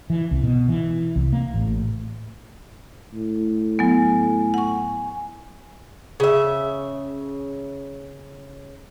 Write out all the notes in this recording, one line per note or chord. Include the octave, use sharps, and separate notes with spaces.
E3
C2
B2
E3
C2
A#3
A1
A2
F#3 B3 G#5
F#5 C#6
C#3 E5